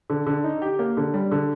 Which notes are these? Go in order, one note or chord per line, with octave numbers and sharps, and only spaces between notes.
D3
D3
D#4
G4
A#3
D3
G3
D3